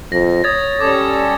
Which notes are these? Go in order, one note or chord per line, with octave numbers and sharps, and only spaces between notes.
F2 A#6
C#5 D#6 G#6 A6
G3 C#4 A4 D6 G#6